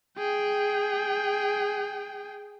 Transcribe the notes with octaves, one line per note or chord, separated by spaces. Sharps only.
G#4 G5